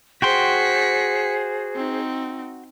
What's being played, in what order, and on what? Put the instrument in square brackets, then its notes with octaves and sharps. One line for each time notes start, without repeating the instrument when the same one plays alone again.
[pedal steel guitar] F#4 G5 C6 [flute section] G#4 C5 [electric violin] B6 C#7
[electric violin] C4 D#4